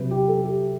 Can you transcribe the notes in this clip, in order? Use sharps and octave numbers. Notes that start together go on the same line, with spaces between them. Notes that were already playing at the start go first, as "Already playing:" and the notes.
Already playing: C3 F#3 B4
G4
A4
G4